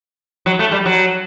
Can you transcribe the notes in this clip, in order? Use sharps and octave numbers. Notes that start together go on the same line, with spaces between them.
F#3
A3
G3
F#3